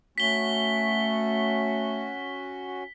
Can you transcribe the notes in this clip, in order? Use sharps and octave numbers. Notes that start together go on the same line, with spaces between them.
A3 C#4 F#4 B6 G7